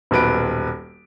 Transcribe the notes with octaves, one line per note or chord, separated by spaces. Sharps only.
D#1 B1 B4 D7